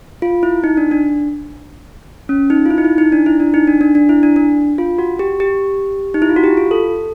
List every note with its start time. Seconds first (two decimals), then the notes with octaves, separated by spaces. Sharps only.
0.22 F4
0.43 E4
0.64 D#4
0.77 D4
0.91 D4
2.29 C#4
2.50 D#4
2.66 F4
2.70 E4
2.78 D#4
2.84 E4
2.98 D#4
3.12 D4
3.26 E4
3.40 D4
3.54 D#4
3.67 D4
3.81 D4
3.95 D4
4.09 E4
4.23 D4
4.36 D4
4.78 F4
4.98 F#4
5.19 G4
5.40 G4
6.14 D#4
6.22 E4
6.29 F4
6.36 F#4
6.44 G4
6.57 F4
6.71 A4